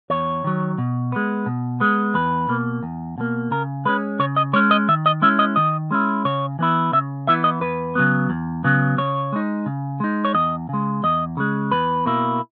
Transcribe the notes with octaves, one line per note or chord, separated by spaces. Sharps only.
E2 C#5
D#3 F#3
B2
G#3 B3
B2
G#3 B3
E2 B4
B2 A#3
E2
B2 A#3
C#3 A#4
G#3 C#4 B4
C#3 C#5
D#5
G#3 C#4 C#5
D#5
D#3 E5
D#5
G#3 C#4 E4 E5
D#5
D#3 D#5
G#3 C#4 E4
C#3 C#5
E3 B3 E4
C#3 E5
E3 B3 E4 E5
D#5
E2 B4
C#3 F#3 B3
E2
C#3 F#3 B3
C#3 C#5
G#3 D#4
C#3
G#3 D#4
C#5
E2 D#5
C#3 G#3
E2 D#5
C#3 G#3
E2 B4
B2 A#3 E4